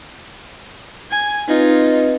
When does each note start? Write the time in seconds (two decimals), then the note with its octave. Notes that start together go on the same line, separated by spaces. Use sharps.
1.11 G#5
1.48 C4 D#4 F4 B4 D#5